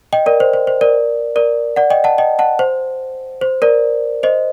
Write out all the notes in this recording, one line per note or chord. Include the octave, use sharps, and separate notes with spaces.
D#5 G5
A#4 D5
C5
C5
C5
A#4 D5
A#4 D5
D5 F#5
D#5 G5
F#5 A5
D#5 G5
F#5 A5
C5
C5
A#4 D5
C5 D#5